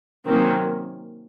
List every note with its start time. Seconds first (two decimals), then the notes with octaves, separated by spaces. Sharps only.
0.25 C3 D#3 F#3 A#3 C4 C#4